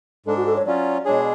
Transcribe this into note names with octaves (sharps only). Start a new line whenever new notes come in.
G#2 G#3 D4 A4
F#4
A4
C#5
F#3 C#4 F4 D5
B2 G#3 D4 G#4 C#5